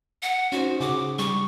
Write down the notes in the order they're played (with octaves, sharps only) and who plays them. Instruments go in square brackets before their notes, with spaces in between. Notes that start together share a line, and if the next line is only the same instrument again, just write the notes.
[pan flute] F#5
[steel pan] C#4 D#4 C5 [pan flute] F#4
[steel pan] C#3 F#4 G#4 [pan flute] D6
[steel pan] G3 [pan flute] C#6